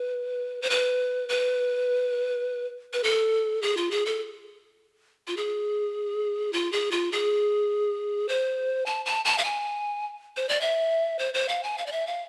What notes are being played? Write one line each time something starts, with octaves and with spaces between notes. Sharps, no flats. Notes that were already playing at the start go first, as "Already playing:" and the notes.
Already playing: B4
C5
B4
B4
B4
A4
G#4
F4
G#4
A4
F4
G#4
F4
G#4
F4
G#4
C5
A5
A5
A5
F5
G#5
C5
D5
E5
C5
C5
F5
G#5
F5
D5
E5
F5